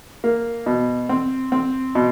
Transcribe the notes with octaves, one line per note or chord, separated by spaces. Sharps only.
A#3
B2
C4
C4
B2